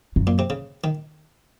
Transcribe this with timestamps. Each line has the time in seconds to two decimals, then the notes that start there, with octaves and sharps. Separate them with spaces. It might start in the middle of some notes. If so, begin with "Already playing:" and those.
0.16 F#2
0.27 A#2
0.39 C3
0.50 C#3
0.84 D#3